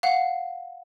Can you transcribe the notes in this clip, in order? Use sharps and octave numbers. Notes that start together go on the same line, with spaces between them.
F5 F#5